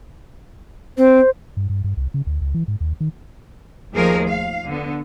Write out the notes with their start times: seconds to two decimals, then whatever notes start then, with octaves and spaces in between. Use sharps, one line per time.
0.98 C4 C5
1.57 G2
1.70 G2
1.84 G2
1.97 C2
2.14 C#3
2.27 D2
2.41 C#2
2.54 E3
2.68 G#2
2.81 D#2
3.00 D#3
3.93 D#2 F3 A3 G#4 A#4
4.27 F5
4.65 D3 B3